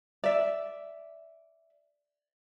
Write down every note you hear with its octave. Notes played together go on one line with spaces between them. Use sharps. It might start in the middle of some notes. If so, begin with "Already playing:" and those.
D5 E5